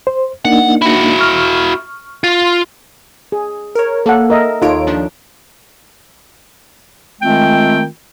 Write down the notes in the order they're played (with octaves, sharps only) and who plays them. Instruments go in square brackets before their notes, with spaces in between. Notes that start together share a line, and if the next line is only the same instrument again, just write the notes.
[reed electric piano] C5
[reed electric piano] A#3 D4 D#4 [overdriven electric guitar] F#5
[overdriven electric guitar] E4 F#4
[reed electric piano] C#6 F6
[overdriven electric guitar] F4
[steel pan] G#4
[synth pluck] A#4 C#5
[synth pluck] A#3 [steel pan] A4 F#5
[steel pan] A#4 D#5 E5
[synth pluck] D#2 C#5 D7 [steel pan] D#4 F4 A4
[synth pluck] F3 D4
[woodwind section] D#3 G#3 A3 C4 F4 G5